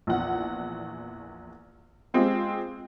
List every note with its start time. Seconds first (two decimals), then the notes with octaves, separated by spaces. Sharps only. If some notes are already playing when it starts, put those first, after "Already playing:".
0.07 A#1 E2 F#5
2.14 G#3 C4 F4 G4 G#4